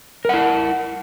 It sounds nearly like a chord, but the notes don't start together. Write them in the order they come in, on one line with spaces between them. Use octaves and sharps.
A#4 F#5 E4